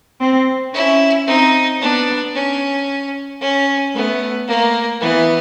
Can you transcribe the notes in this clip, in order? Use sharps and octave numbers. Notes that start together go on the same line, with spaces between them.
C4
C#4 E4
C4 D#4
B3 D4
C#4
C#4
A3 B3
A#3
E3 B3